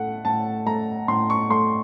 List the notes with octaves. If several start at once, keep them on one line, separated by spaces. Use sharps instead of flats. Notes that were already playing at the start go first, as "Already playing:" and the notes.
Already playing: A2 A3 F#5
A2 A5
A3 A#5
A2 C6
C#6
A3 C6